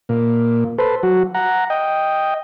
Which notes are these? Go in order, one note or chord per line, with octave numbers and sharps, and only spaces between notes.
A#2
A4 B4 C5
F#3 F#4
F#5 A#5
D#5 G5